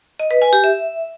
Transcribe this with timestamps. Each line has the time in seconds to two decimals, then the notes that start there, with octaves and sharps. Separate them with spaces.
0.20 D#5
0.31 B4
0.42 G#5
0.53 G4
0.64 E5